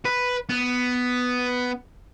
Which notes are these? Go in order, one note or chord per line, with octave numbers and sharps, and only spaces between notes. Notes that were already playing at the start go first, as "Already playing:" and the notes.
B4
B3